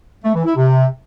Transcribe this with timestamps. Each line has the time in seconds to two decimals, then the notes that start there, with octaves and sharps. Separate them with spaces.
0.24 A3
0.34 E3
0.45 E4
0.55 C3